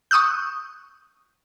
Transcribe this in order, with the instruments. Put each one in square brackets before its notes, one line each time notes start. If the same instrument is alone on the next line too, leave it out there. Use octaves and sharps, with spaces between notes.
[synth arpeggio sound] C#6 D#6 E6 F#6 G6